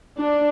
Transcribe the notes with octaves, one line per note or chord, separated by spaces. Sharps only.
D4